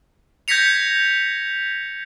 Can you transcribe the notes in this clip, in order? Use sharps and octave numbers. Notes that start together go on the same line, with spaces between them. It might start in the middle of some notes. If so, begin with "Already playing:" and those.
G6 G#6 A#6 B6 C#7 F7